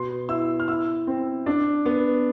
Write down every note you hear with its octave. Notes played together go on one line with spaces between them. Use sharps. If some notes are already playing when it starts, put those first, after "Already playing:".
Already playing: B2 B3 C6
E4 E6
F6
E4 E6
C4
D4
B3